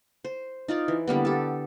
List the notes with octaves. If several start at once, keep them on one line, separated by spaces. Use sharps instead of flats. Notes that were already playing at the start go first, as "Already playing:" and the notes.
C5
D#4 F4 D5
E3
D3 G3 A#3 B3
G4 A4